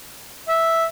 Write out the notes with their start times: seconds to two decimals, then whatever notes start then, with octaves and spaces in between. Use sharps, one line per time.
0.48 E5